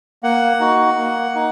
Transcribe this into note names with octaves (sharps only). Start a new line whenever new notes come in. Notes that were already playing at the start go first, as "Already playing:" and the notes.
A#3 F#5
D#4 F#4
A#3
D#4